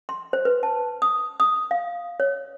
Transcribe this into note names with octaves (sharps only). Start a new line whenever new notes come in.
C6
C5
B4
A5
D#6
D#6
F5
C#5